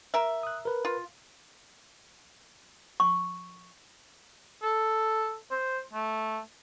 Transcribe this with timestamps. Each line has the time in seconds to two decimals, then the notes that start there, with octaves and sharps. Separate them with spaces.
0.14 A#4 E5
0.43 D#6 F#6
0.65 A#4 B4
0.85 F4
3.00 C#6
4.62 A4
5.51 C5
5.93 A3